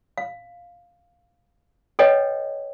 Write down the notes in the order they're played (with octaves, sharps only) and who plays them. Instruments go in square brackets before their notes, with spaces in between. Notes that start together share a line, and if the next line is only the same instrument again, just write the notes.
[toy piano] F5
A4 B4 C#5 D#5 F#5 G5